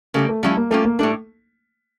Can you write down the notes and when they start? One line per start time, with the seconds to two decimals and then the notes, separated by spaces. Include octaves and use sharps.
0.14 C#3 G3 A3 A#3
0.29 A3
0.43 F3 G3 A3 C#4 E4
0.57 A#3
0.71 G3 A3 A#3 C#4 F4
0.85 A#3
0.99 A2 G3 A3 D4